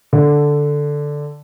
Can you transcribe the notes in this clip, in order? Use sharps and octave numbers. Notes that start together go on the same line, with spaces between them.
D3